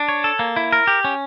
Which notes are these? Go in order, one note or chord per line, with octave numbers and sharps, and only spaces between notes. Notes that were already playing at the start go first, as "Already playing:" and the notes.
Already playing: D4
C#5
A4
A#3
E4
A#4
G4
C#4